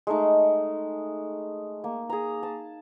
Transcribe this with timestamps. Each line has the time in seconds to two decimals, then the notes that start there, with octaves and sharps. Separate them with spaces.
0.07 G#3 A3 D#4
1.84 A#3
2.10 G#4 A#5
2.43 A5